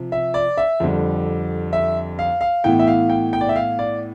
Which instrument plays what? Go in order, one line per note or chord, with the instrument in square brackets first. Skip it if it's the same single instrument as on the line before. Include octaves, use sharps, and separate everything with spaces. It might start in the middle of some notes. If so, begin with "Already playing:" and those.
Already playing: [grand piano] C3 F3
E5
D5
E5
F2 D3 G3
E5
F5
F5
A2 E3 B3 G5
E5
F5
G5
G5
D5
E5
F5
D5